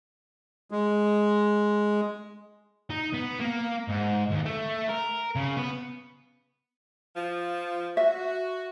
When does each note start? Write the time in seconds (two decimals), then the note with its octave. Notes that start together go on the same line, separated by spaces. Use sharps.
0.71 G#3
2.90 D#4
3.14 B3
3.40 A#3
3.89 G#2
4.31 D#2
4.46 A3
4.89 A#4
5.36 C#3
5.56 B3
7.16 F3
7.97 F#4 E5